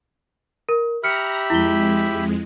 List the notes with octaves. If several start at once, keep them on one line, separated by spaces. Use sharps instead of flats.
A#4
G4 E5 A#5 B5 F6 C#7
F2 G#3 E4 G7